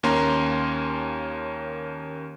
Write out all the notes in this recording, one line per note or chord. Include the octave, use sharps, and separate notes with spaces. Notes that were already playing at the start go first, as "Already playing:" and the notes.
D#2 A#3 C#4 A#5 C6